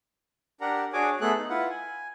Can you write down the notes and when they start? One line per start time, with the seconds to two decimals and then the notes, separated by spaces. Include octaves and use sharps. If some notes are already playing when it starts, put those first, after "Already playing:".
0.61 D4 G4 A#4 F#5 A#5
0.93 D4 F#4 G#4 C#5 G#5 D6
1.21 A3 B3 G#4 A4 F#6
1.37 D#4
1.50 E4 F4 B4 F#5
1.70 G#5